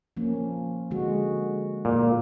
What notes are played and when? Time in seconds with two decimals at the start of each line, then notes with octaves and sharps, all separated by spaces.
0.17 F3 A#3 C#4
0.91 D3 G#3 F#4
1.85 A#2